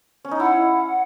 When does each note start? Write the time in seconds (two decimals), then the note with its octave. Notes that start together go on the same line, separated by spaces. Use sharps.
0.25 C#4
0.31 D#4
0.40 E4 F#5